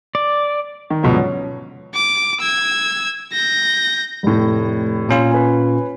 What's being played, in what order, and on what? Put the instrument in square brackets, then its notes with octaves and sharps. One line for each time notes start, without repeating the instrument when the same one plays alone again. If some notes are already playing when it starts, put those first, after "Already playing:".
[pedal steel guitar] D5
[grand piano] D#3
G#2 B2 D3 F3 F#3 C#4
C#4
[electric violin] D6
E6 G#6
G6 A#6
[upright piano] F1 A2
[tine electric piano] A#2 C#4 F4
[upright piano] B4 G#5